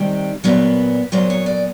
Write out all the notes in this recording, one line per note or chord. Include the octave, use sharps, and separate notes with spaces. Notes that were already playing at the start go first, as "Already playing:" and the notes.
Already playing: C3 D#3 G3
A#2 F#3 B3 B4
A#2 F#3 B3 C5
C#5
D5